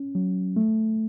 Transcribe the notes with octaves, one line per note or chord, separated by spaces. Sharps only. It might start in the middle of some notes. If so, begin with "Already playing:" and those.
Already playing: C#4
F#3
A3